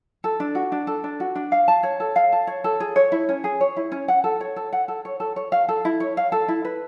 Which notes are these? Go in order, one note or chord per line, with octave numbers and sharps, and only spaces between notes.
A4
D4
F#4
D4
A4
D4
F#4
D4
F5
A5
C#5
A4
F5
A5
C#5
A4
G#4
C#5
E4
C#4
G#4
C#5
E4
C#4
F#5
A4
C#5
A4
F#5
A4
C#5
A4
C#5
F5
A4
E4
C#5
F5
A4
E4
B4